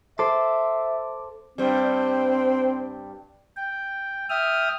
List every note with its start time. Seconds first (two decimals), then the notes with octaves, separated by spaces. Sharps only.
0.19 A4 C5 E5 D6
1.58 G2 G3 C4
3.57 G5
4.30 E5 G5 D#6 F6